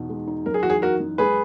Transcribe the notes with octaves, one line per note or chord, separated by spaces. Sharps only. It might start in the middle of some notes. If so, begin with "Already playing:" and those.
Already playing: E2 B2 D#4
G#3
D#4
F#2 A#4
G#4
E3 F#4
G#4
D#4 F#4 A#4
F#2
G#3 G#4 B4